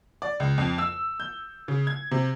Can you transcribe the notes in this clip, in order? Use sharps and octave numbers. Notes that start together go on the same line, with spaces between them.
D5
C#2
F2
E6
G6
C#3
G#6
C3